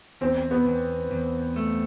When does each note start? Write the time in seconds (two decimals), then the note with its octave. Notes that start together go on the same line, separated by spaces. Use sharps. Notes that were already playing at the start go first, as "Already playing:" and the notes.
0.21 E2 C4
0.51 B3
0.66 E2
1.11 E2
1.56 A3